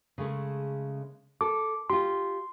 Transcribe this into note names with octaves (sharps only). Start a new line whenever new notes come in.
C#3 G#3 A3
A4 D6
F4 G4 C6